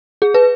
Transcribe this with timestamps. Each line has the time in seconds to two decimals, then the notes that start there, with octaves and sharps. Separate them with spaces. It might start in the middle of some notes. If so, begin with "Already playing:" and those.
0.22 G#4
0.34 B4